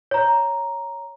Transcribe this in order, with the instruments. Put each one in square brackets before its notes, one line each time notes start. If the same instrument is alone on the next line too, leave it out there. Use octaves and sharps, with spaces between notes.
[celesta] C#5 A#5